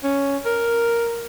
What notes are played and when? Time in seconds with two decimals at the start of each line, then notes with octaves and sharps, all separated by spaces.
0.04 C#4
0.46 A#4